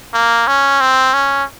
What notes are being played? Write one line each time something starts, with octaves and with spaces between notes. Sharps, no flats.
A#3
C#4
C4
C#4